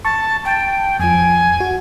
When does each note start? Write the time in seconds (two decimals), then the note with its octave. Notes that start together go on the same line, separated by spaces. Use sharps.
0.05 A5 C#6
0.45 G5 A5
0.99 F2 F3 G#5
1.60 F#4